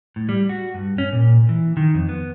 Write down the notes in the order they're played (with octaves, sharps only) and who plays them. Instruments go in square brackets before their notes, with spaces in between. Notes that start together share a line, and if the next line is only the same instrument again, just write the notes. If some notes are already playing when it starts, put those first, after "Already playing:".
[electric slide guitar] A2
G3
F#4
G2
C#4
A#2
E3
D#3
F2
B3